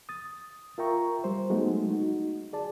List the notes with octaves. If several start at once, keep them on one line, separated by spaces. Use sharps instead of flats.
D#6 A6
F4 A#4 E5 G5 A#5 C#6
G3 C5
F#3 G#3 A3 B3 D#4 F#4
D#4 F#4
G#4 D5 A5